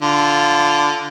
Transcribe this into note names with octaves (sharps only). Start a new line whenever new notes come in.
D3 F4